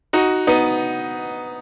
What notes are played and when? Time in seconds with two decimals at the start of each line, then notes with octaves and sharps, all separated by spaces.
0.13 D#4 F#4
0.47 B3 D#4